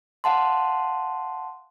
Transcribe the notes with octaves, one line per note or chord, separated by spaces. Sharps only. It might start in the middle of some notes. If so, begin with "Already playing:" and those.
F5 F#5 A5 C6